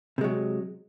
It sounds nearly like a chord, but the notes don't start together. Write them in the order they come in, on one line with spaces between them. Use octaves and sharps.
C3 G#3 F#3